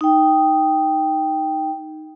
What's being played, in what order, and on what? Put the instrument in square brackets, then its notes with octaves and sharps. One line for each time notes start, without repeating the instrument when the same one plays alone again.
[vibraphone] D#4 G5